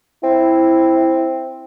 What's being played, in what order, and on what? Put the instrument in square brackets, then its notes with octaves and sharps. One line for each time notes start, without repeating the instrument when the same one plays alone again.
[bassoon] C4 [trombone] E4